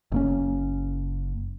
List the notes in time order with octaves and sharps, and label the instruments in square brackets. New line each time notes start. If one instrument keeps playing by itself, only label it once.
[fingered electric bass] F#1 A#3 C#4